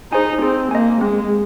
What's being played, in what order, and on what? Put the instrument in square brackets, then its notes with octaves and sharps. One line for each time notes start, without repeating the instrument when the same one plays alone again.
[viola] D#4 [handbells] G#4 C5 G#5
[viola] C4 [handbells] G#4
[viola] A#3 [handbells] D#5 G#5
[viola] G#3 [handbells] C4